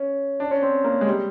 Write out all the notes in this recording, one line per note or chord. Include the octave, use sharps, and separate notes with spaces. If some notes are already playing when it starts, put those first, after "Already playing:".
Already playing: C#4
D4
C#4
C4
A#3
G#3
G3